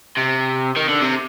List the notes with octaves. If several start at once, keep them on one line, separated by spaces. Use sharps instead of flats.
C3
D#3
D3
C3